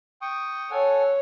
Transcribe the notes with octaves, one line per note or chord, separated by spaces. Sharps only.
G5 C#6 D#6
A4 C#5 F#5 G#5